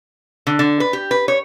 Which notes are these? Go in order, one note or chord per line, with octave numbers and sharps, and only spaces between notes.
D3
D3
B4
G4
B4
C#5